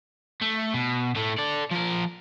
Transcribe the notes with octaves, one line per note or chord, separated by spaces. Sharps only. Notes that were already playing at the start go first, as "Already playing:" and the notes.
A3
B2
A2 A3
A4 D5
F3 A#4